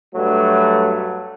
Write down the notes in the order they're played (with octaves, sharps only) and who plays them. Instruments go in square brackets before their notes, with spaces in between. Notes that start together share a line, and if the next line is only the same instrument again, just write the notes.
[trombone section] G2 F#3 A3